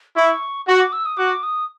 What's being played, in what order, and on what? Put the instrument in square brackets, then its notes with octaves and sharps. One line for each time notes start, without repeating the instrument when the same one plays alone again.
[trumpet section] E4 [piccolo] C#6
[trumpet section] F#4 [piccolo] C#6
[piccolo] D6
E6
D#6
[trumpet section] F#4 [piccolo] D6
[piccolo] D#6